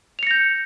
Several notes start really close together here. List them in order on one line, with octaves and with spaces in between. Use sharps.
F7 C#7 A#6 G6